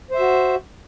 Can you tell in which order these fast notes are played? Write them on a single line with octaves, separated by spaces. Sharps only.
C5 E5 F#4